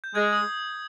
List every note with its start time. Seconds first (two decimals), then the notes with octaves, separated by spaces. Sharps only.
0.04 G6
0.14 G#3 G#6
0.33 D#6